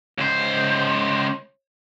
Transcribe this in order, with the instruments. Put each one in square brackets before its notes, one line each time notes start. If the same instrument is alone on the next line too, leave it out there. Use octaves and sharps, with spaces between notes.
[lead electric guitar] C#2 C5